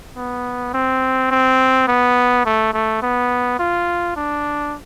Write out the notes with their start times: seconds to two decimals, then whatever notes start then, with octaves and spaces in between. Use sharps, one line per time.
0.16 B3
0.74 C4
1.31 C4
1.88 B3
2.46 A3
2.74 A3
3.02 B3
3.59 F4
4.16 D4